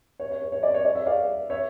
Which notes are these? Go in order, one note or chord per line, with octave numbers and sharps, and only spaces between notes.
C#5
C#5
C#5
C#5
D5
C#5
D5
C#5 E5
D5 F5
C#5 E5